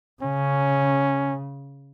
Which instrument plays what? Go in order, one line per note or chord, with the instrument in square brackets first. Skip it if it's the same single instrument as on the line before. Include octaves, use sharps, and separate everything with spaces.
[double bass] C#3 [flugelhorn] C#4